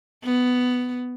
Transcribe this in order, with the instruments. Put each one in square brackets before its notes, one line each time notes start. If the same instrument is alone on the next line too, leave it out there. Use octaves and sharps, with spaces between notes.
[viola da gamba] B3